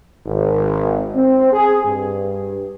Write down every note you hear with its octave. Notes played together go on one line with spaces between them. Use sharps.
G#1
C4
G#4
G2